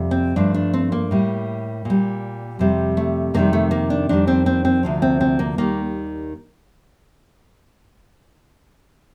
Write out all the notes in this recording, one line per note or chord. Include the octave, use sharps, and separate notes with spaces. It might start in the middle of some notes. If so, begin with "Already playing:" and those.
Already playing: F2 C3 G3
C4
G2 F3 A3 D4
D4
C4
A#3
A2 G3
A#2 G3
F2 C3 G3
A3
F2 C3 D#3 G3 A#3
A3
A#3
D4
F2 D#3 G3 D4
C4
C4
C4
D2 C3 F3
C4
C4
A#3
D#2 D#3 G3 A#3